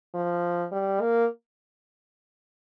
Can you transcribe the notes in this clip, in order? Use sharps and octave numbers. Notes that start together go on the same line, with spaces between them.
F3
G3
A#3